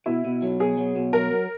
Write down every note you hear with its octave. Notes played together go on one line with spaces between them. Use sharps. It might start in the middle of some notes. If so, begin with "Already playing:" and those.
B2 E4
B2
F#3
B2 G#4
F#3
B2
F#3 A#4
F#3